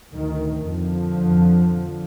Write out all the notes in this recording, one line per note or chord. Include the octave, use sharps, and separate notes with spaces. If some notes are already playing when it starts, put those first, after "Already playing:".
D2 D#3
F2 D3 F3
F2